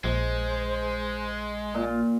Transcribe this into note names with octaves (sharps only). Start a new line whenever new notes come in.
A#1 G#3 C5
A#2 F4